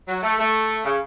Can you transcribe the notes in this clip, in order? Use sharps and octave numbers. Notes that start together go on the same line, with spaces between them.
F#3
A3
A3
C#3